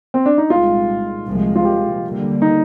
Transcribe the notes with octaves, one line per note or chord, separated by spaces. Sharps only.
C4
D4
D#4
C2 A#2 G#3 F4
C2 A#2 F3 G#3
F4
G4
D#2 D3 G3 A#3
D#4